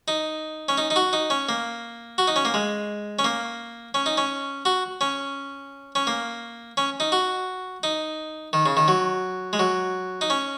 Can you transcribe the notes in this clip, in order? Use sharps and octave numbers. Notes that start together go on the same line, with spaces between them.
D#4
C#4
D#4
D#4
F#4
D#4
C#4
A#3
F#4
D#4
C#4
A#3
G#3
C#4
A#3
C#4
D#4
C#4
F#4
C#4
C#4
A#3
C#4
D#4
F#4
D#4
D#3
C#3
D#3
F#3
G#3
F#3
D#4
C#4